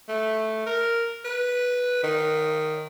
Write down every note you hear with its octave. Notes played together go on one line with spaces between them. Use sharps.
A3
A#4
B4
D#3